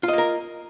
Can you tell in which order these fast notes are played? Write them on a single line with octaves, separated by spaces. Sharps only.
F4 D#5 A#3 A#4